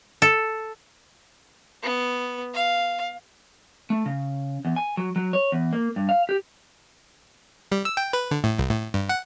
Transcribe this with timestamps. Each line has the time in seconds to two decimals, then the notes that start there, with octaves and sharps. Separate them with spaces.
0.22 A4
1.83 B3
2.54 F5
3.90 A3
4.06 C#3
4.65 E2
4.76 G#5
4.97 F#3
5.16 F#3
5.33 C#5
5.52 E2
5.73 A#3
5.96 G2
6.09 F5
6.29 G4
7.72 G3
7.85 E6
7.97 G5
8.13 B4
8.31 D3
8.44 A2
8.59 C2
8.70 A2
8.94 G2
9.09 F#5